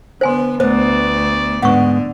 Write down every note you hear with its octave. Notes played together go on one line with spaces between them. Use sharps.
D3 B3 C5 G#5 C6
D2 A3 B3 C5 D5
G#2 D3 B3 F#5 C#6